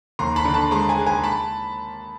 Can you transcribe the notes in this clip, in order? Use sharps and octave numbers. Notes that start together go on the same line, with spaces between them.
D#2 A#5 C6
A5 B5
D3
A5 B5
G#3 A#5 C6
G#5 A#5
G#3
G#5 A#5
A5 B5